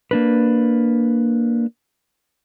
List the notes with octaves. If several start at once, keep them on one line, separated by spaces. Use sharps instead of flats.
A#3 D4 B4